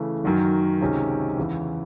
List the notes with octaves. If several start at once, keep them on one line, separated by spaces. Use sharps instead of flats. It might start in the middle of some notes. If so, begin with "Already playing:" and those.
Already playing: C#3 E3 A3
F#2 D#3 F#3
C#2 C3 D#3 G#3 C#4
E2 C#3 E3